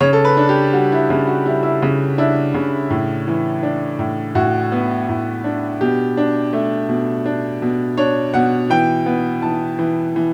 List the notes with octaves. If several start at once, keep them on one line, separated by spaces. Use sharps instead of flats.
C#3 C#5
A4
B4
D4
G4
G3 F#4
E4
C#3 E4
F#4
G3 E4
E4
C#3
D4 E4
C#3
A2
E3
D4
A2
A2 F#4
B3
A2
D4
B2 G4
D4
A3
B2
D4
B2
D4 C#5
B2 F#5
E3 G5
B3
E3 A5
E3
E3